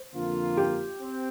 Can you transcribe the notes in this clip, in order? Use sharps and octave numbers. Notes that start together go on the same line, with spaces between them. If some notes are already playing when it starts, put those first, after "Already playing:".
Already playing: C5
F2 D3 F3 A#3 F4
G4
C4